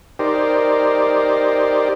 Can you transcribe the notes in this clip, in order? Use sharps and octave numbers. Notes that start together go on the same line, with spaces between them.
D#4 G4 A#4 C5 D5